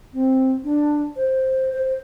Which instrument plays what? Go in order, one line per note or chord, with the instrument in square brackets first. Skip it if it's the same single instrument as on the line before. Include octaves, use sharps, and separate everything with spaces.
[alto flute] C4
D4
C5
C5